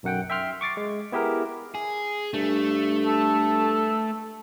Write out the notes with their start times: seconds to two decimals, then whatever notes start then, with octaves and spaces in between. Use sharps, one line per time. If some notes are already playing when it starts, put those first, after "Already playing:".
0.03 B1 F#2 F#5 G5
0.30 E5 G5 C6 F6
0.61 C#6 D6 A6 C7
0.77 G#3
1.12 B3 E4 G4 G#4 A#4
1.75 G#4
2.34 G2 A3
3.06 A4